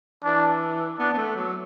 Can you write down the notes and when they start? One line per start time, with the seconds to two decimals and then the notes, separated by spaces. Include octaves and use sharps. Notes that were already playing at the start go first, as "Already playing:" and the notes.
0.24 E3 D4
0.99 B3 D4
1.14 B3
1.18 A3
1.36 F#3